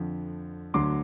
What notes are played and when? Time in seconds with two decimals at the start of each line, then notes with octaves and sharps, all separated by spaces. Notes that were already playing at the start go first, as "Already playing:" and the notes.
Already playing: F2 D3 F3
0.74 D2 D3 F#3 C6 D6